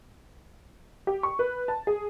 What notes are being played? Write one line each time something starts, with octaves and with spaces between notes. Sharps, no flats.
G4
C#6
B4
A5
G#4